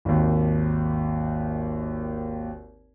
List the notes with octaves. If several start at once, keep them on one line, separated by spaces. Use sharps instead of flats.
G#1 D#2